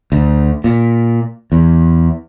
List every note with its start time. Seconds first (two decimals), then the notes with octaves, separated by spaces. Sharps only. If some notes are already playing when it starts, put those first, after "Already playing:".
0.12 D2
0.64 A#2
1.52 E2